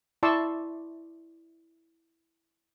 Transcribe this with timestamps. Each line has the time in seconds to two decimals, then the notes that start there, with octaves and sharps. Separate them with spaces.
0.23 E4 D5 A5 C6 C#6 E6